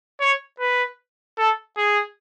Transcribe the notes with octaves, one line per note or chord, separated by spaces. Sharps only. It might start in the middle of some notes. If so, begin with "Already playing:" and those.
C#5
B4
A4
G#4